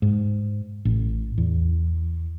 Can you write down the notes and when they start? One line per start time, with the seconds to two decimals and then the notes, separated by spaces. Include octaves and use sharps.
0.02 G#2
0.85 A1
1.38 E2